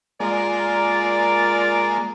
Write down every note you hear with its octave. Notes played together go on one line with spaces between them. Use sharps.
G#3 A#3 F4 A#4 D5